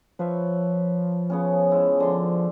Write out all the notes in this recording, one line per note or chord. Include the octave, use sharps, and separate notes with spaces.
F3 B4 C#5 E5
C#3 B3 C#4
G#3 E4
D3 C6